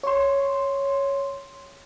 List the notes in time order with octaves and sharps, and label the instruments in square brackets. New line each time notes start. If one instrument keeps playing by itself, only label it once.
[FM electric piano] C#5 C6